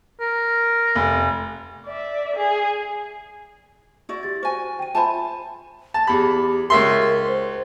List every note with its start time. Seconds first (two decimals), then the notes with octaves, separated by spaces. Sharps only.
0.20 A#4
0.95 F1
1.86 D5 E5
2.36 G#4
4.09 E4 F#4 D5
4.23 G4 A6
4.43 F#4 C5 G#5
4.79 G5 D#7
4.95 F4 C5 E5 G#5 A5 B5
5.94 A5
6.07 E2 G4 B5
6.70 C#2 A#4 E5 C6
7.27 C5